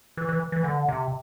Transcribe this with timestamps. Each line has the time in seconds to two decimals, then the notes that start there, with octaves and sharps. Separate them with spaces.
0.17 E3
0.29 E3
0.52 E3
0.64 D3
0.89 C3